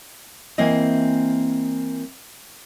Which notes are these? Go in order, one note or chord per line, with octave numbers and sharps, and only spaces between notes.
E3 A#3 C4 E4 D#5